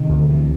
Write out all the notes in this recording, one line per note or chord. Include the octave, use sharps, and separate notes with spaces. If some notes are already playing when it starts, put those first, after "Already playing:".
Already playing: C3 D#3
D2
C3 E3